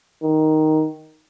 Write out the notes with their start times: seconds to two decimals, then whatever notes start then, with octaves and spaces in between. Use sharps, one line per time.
0.23 D#3